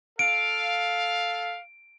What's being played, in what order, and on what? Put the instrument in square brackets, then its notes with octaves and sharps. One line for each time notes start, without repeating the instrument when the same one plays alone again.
[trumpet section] A4 F5 [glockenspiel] D7